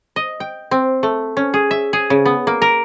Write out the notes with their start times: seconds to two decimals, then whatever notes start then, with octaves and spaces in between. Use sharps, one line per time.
0.16 D#5
0.40 G5
0.71 C4
1.03 A3
1.37 C#4
1.54 G#4
1.71 E5
1.93 G#4
2.10 C#3
2.25 B3
2.47 A#3
2.62 A#4